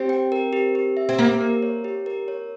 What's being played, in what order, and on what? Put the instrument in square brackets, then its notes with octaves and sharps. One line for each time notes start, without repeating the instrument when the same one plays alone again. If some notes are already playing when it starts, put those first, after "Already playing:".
Already playing: [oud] C4 [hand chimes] G4
[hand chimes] G5
A#4
G4
G4
E5
[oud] C4
[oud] A#3 [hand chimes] G4
[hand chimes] A#4
C#5
G4
A#4
C#5